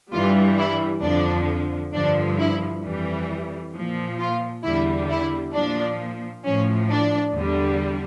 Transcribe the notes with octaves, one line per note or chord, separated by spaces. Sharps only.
G2 E3 G3 F4
E4
F2 D3 F3 D4
G2 D3 F3 D4
E4
F2 E3 G3
A#2 F3
F4
E2 D3 G3 E4
E4
A#2 F3 D4
A2 F3 C#4
D4
E2 D3 G3